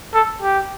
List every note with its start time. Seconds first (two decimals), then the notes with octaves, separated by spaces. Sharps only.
0.14 A4
0.41 G4